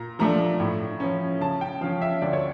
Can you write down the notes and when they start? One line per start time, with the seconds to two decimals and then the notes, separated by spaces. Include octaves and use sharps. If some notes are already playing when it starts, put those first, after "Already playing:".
Already playing: A#2 A#5
0.19 F3 A3 D4 A#5
0.60 A2
1.00 F3 C#4
1.40 C#3 A5
1.61 G5
1.81 F3 C#4 F5
2.01 E5
2.22 D2 D5
2.33 C#5